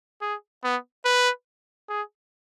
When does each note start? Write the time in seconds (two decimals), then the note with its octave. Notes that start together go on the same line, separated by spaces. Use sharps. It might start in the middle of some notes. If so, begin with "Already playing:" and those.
0.22 G#4
0.64 B3
1.05 B4
1.89 G#4